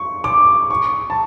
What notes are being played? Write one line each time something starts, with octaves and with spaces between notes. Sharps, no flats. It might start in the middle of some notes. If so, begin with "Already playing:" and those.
Already playing: C#6
D6
C#6
A5